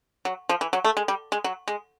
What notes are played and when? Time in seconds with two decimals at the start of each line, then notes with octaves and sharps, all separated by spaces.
0.25 F#3
0.49 F3
0.61 E3
0.73 F#3
0.84 A3
0.97 G#3
1.08 G3
1.32 G#3
1.44 F#3
1.68 G#3